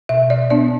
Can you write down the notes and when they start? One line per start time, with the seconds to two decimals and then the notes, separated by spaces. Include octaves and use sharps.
0.09 B2 E5
0.30 D5
0.50 B3 D4 D5